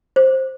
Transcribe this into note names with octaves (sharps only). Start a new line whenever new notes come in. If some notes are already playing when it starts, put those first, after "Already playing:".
C5